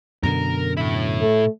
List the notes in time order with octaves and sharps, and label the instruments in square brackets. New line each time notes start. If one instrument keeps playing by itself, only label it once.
[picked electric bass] F#2 B2 D3 [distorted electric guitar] A#4
[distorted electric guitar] A2 E4
[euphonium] A3